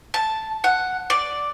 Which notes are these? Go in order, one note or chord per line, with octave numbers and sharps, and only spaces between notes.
A5
F#5
D5